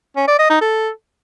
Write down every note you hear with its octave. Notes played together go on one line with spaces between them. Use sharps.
C#4
D5
D#5
D#4
A4